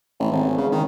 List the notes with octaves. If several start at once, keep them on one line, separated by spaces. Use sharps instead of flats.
A1
G#1
C#3
D#3